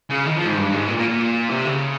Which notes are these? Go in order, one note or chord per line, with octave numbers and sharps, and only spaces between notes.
C#3
D#3
F3
G#2
G2
G#2
A#2
A#2
A#2
C3
C#3